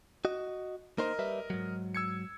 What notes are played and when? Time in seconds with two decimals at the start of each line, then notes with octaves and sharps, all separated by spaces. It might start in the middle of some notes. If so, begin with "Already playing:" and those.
0.25 F#4 D#5
0.98 A#3 D#4 A#4 C5 D#5
1.19 G3 B4 E5
1.50 G#2 F#3
1.95 E6 G#6 C#7